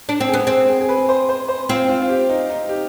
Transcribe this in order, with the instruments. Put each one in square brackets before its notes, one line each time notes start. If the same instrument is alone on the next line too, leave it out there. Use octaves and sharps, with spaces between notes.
[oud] D4
C4
[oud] B3 [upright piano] G#4
[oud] C4 [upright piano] G#4
[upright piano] G#4
G#4
B4
C5
C5
C5
[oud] C4 [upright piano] F4
[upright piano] F4
F4
G4
D#4
D#4
G4